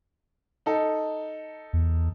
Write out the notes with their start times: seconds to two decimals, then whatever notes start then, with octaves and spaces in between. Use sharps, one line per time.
0.66 D#4 A4
1.73 E2